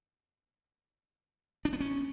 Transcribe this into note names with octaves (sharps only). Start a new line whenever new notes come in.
D4
B3
C#4